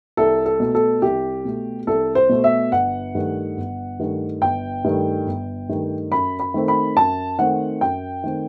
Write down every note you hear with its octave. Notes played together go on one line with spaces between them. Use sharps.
C2 A4
A4
B2 A3
A4
C2 G4
B2 A3
C2 A4
C5
B2 A3
E5
G1 F#5
G2 D#3 A3
G1
G2 D#3 A3
G1 G5
G2 D#3 A3
G1
G2 D#3 A3
F#2 B5
B5
D#3 A3 C4
B5
F#2 A5
D#3 A3 C4 F#5
F#2 G5
D#3 A3 C4